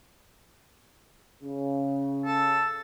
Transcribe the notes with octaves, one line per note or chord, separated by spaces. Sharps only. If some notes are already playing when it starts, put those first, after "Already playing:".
C#3
A4